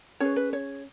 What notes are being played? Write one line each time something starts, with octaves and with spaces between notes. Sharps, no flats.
C#4 G#4 B4 C#5
B4
C#5